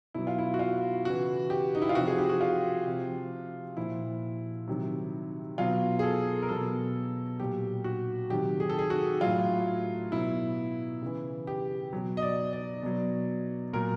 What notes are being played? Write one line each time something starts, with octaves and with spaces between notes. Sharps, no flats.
B2 F#3 E4
F4
E4
F#4
F4
C#3 E3 F#4
G4
D#4
E4
F4
C3 F3 F#4
G#4
G4
F#4
F4
C3 F3
A#2 F3 E4
C3 D#3 F#3
B2 F#3 F4
G#4
A4
A#4
B2 F#3 A4
A#2 F#3 G4
F#4
C3 D#3 F#3 G4
G#4
A4
G#4
F#4
A2 F#3 F4
B2 F#3 E4
C#3 E3
G4
B2 F#3
D#5
D5
D5
B2 F#3
A#2 F#3 A#4